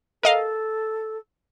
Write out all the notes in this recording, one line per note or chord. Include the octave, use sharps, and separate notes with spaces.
A4 A#4 D#5 F5